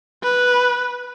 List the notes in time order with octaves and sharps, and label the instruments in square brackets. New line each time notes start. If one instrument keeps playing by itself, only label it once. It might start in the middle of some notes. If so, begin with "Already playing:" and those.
[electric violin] B4